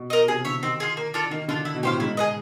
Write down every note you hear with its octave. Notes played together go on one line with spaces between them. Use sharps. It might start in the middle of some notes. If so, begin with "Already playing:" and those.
Already playing: B2
B2 A#4 D#5
C3 G#4
D3 C#5 E5
D#3 C4
F4 G#4
A#3
D4 F4 A4
D#3 A#3
D3 D4 F4
E4
B2
A2 G4 C5 F5
G#2 E4
G#4 B4 D#5